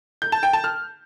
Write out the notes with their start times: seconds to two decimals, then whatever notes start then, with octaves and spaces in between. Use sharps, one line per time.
0.22 G6
0.32 A5
0.43 G5
0.53 A5
0.64 F6